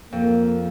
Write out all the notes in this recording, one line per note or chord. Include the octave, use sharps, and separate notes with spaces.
F2 A#3